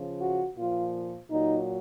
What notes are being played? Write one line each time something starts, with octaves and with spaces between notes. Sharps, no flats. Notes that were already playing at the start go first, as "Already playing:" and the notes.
Already playing: C#3 F3
F#4
A#2 F3 F4
A#2 F#3 D#4